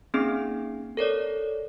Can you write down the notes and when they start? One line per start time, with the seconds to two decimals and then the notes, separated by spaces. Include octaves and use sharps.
0.14 A#3 C4 C#4 D#4 G#4 C7
0.97 A4 A#4 C#5 D5